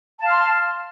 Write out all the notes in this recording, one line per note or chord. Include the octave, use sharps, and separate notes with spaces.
F5 A5 C6 F6